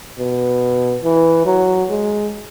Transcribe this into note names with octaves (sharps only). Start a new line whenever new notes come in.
B2
E3
F#3
G#3